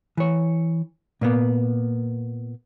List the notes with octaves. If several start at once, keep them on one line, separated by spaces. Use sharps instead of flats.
E3 C#5
A#2 A#3 B3